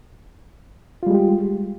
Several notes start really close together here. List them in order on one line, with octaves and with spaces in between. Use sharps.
F4 G3 G#3 G4